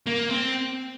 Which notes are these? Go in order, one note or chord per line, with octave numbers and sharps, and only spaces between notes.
A#3
C4